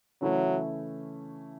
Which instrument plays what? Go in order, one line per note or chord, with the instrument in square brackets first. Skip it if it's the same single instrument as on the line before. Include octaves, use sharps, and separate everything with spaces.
[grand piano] C#3 E3 A3 C#4 E4 [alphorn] F#3